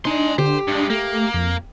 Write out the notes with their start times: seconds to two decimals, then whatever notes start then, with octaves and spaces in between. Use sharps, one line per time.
0.05 D4 D#4 G#5 C6
0.38 D3 G4 C5
0.68 G2 G#3 D4
0.90 A3 A#3
1.34 F2